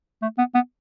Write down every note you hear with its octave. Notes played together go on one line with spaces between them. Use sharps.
A3
B3
B3